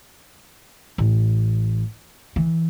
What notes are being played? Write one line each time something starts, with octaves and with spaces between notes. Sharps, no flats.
A1
E3